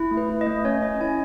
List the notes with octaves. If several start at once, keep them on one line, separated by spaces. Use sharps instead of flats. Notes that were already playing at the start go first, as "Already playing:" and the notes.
Already playing: E4
A3
B4
E4
D#5
A3
C#4 C#5
C#4 D#5
E4 G#5